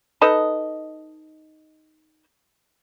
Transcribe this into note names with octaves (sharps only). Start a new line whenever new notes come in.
D#4 A4 B4 D#5